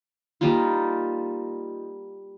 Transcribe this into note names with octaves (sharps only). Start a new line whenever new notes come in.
G3 A#3 D#4 F4